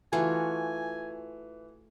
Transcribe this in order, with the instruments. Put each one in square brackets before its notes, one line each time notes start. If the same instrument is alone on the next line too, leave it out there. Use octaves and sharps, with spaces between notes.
[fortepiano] E3 [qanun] A3 F4 F#4 [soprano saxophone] G#5